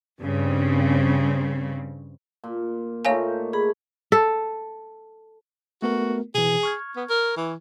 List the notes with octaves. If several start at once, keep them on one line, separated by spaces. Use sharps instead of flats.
G2 C#3 C4
A#2
A#2 A3 D#4 C#5 F5 G#5
G#4 B5
A4
A3 B3 F#4 A#4
B2 E3 G#4
C#6 F6 G#6
B3
A#4
E3